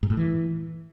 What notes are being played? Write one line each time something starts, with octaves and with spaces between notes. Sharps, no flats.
G#2
A2
E3